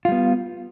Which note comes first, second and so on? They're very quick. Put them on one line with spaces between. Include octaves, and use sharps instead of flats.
F4 G3 B3